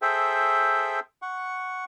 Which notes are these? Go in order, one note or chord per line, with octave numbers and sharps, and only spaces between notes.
G#4 A4 C5 E5 G5
F#5 C#6